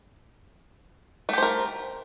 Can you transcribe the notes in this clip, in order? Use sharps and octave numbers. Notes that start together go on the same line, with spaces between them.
A3 G4 A#4 C5